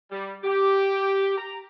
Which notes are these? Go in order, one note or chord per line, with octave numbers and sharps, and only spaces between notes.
G3
G4
A#5